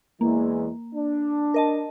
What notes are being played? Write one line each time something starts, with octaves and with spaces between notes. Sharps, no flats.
E2 E3 G#3 A#3
D4
A#4 D#5 A5